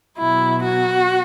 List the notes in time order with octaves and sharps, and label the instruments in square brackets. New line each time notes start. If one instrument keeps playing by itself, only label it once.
[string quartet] B2 F#3 E4
F#4